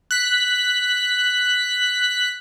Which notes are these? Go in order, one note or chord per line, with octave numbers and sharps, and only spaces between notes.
F#6 B6